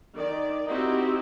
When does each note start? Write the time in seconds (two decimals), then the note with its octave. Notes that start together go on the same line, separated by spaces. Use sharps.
0.16 D#3 D5
0.67 C4 D#4 E4 F#4 G4